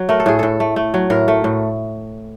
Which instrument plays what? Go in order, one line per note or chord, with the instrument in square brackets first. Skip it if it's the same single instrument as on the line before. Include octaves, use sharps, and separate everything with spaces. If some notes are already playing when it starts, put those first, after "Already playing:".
Already playing: [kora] F#3
A3 A#4
A4
A2 G#4
A2 A4
A3
A3
F#3
A2 A#4
A3
A2